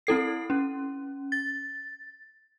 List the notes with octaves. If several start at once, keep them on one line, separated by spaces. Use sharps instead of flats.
C4 E4 A4 C7
C#4
A6